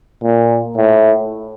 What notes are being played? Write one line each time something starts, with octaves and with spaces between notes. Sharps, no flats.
A#2
A2